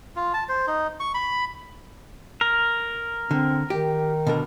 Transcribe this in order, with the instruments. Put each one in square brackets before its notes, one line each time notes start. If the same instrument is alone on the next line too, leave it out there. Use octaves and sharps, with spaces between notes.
[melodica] F4
A5
C5
D#4
C#6
B5
[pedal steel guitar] A#4
[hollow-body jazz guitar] D3 [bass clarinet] C4
[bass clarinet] D#3 [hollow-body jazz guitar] G4
[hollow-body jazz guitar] B2 D3 A#4